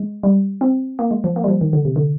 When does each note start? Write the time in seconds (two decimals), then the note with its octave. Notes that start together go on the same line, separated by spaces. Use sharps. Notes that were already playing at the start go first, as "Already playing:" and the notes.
Already playing: G#3
0.23 G3
0.61 C4
0.99 A#3
1.11 G#3
1.24 F3
1.36 A#3
1.44 G3
1.48 F3
1.61 D#3
1.73 D3
1.85 C3
1.96 D3